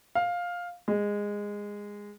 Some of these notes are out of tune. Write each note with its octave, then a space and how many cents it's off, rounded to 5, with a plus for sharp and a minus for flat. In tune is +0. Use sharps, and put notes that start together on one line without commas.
F5 +10
G#3 -15